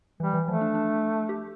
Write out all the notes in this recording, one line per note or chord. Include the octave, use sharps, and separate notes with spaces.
E3 G3
E3
F3 A3
D4
D4
G4